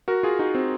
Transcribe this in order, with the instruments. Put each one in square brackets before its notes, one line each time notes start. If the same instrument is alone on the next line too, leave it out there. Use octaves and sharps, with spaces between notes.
[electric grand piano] F#4 A#4
F4 G#4
D#4 F#4
C4